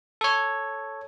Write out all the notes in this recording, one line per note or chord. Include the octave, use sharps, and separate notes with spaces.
A4 C#5